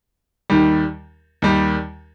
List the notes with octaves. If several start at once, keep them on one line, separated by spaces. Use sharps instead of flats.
D#2 D#3 G3
D#2 D#3 G3